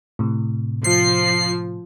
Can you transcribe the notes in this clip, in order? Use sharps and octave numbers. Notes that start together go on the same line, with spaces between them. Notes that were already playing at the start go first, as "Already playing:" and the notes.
A2 C3
F3 C7